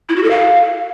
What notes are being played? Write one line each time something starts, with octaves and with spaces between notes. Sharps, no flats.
E4
F#4
A4
F5